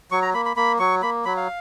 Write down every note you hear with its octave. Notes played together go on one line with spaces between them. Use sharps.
F#3 C#6
A#5
A#3 B5
B5
A#3 B5
F#3 C#6
A#3 B5
F#3 B5
F5